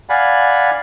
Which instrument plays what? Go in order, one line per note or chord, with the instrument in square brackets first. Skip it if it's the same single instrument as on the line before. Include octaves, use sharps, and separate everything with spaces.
[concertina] D5 F5 F#5 G#5 B5